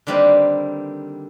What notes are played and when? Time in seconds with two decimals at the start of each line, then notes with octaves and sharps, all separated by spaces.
0.07 D3 D#3 G3 A#3 C4 B4